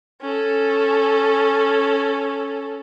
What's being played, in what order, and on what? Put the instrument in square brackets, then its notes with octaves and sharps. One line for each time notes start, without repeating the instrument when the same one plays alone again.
[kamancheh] C#4 A4